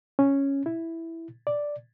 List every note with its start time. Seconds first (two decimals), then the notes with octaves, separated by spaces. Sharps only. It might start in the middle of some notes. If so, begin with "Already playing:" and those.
0.19 C#4
0.66 E4
1.47 D5